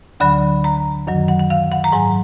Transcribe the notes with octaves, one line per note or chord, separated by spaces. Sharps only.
D2 D3 F#3 B5
A#5
F#2 D#3 F#3
F#5
F#5
F5
F#5
A#5
G#2 F#3 G#5